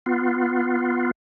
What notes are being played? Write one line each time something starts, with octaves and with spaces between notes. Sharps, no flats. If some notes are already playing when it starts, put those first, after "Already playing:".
B3 F4